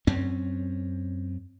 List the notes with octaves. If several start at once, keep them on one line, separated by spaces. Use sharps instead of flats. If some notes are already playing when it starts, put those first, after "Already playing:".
F#2 C4 C#4